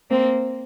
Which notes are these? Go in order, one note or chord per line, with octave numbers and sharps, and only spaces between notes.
A#3 C4